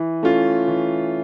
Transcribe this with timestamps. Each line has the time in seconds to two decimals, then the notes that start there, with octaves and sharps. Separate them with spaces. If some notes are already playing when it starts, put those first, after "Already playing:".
Already playing: E3
0.23 A3 C#4 F4
0.68 E3